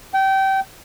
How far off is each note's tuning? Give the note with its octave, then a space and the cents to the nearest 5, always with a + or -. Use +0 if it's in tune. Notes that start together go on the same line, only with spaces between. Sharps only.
G5 -25